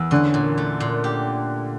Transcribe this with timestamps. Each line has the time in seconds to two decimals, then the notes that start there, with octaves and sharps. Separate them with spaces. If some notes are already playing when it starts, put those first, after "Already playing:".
Already playing: E2 E3
0.11 D3 C#4
0.34 A#2
0.58 A3
0.80 A#2
1.04 G4